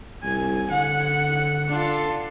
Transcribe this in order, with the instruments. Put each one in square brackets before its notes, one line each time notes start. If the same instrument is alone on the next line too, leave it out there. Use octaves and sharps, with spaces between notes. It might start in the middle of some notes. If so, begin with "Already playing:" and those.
[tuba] C2 [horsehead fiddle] G#5
[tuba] D3 [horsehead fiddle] F#5
[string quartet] D4 F4 A4